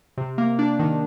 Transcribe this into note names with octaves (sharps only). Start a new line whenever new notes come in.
C3
A#3
D4
D#3